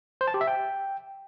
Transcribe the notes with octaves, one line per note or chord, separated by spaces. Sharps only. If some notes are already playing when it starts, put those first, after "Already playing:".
C5
A5
G4
E5
G5